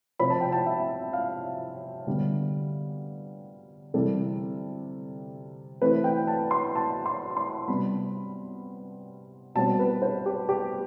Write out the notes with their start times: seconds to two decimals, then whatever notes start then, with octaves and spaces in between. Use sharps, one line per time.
0.19 C3 F3 C4 B5
0.30 A5
0.41 G5
0.52 A5
0.66 E5
1.13 F5
2.07 D3 G3 B3
3.94 C3 E3 G3 A4
5.81 E3 A3 C4 B4
6.04 G5
6.27 A5
6.51 C6
6.75 A5
7.06 C6
7.37 C6
7.68 C3 G3 B3 B5
9.55 B2 G3 C4 A5
9.79 B4
10.02 C5
10.26 G4
10.49 G4